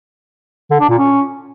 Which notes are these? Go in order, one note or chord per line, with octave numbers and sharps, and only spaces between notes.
D3
D4
A#2
C#4